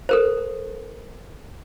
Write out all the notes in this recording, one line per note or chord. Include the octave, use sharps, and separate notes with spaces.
A4 A#4 C5